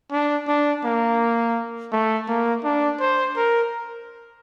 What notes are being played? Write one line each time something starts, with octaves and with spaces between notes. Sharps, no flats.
D4
D4
A#3
A3
A#3
D4
C5
A#4